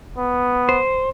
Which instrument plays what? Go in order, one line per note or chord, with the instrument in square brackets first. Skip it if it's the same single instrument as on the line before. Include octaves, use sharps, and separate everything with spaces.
[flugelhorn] B3
[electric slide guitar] C5